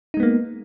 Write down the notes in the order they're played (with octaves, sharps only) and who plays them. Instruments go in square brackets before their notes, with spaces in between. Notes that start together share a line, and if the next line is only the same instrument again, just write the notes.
[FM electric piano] D#4
G#3
B3
A#3